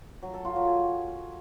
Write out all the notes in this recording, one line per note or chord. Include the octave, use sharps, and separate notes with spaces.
F#3
A4
F4
F#3
G#4